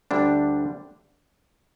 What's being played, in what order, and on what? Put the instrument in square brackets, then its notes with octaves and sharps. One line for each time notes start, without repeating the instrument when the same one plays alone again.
[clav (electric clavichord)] D2 D3 G3 D4